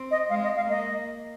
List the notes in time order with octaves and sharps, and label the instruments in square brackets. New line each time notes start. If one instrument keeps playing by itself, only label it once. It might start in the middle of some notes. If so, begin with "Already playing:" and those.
Already playing: [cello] C4
[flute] D#5
[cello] G#3 [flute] F5
[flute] D#5
F5
[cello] A#3 [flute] D#5